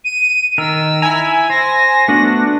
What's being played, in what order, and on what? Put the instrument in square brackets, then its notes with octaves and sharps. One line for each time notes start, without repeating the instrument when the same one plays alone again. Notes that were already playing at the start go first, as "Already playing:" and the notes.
[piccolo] D#7
[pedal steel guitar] D#3 A#4 [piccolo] E6
[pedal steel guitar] E4 A#5 [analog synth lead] G#5
[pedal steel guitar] C5 [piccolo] A#6
[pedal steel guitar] A3 B3 F#4 [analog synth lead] D4